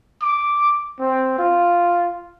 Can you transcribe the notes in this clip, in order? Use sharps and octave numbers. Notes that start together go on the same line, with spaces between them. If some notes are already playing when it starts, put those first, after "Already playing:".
D6
C4
F4